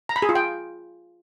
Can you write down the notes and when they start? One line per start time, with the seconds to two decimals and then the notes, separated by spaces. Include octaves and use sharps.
0.09 A#5
0.16 B5
0.22 G#4
0.29 F4
0.35 G5